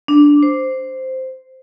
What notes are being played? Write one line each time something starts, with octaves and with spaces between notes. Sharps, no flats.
D4
C5